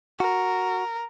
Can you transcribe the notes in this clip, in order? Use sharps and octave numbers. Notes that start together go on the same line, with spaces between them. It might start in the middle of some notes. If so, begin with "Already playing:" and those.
F#4 A#4